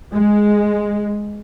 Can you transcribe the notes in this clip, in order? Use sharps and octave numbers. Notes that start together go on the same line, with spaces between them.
G#3